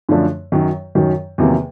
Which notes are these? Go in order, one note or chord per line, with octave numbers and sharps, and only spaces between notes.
F#2 D3 F3 A3 D4
F#2 D#3 F#3
F#2 D#3 F#3
E2 C3 D#3 F#3 A#3